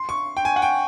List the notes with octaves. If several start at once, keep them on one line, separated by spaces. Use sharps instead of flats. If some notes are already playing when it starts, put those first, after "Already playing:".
Already playing: C6
C#6
G5
G#5
F#5
G5